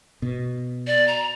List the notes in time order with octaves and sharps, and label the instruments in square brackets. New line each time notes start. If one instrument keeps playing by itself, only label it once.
[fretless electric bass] B2
[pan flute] D5
A#5